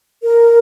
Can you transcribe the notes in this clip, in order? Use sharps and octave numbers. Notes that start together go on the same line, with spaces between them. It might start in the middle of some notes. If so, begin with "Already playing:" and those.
A#4